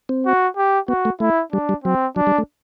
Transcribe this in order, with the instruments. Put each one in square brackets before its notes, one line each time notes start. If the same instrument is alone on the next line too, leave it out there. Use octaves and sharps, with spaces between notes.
[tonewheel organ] C4
[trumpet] F#4
G4
[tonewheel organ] B3 [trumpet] F#4
[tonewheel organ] A3
[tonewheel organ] A3 [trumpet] E4
[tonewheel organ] G3 [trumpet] D4
[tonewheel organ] G3
[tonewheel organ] F#3 [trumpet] C4
[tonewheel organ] F#3 [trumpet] D4
[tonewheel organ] G3
A3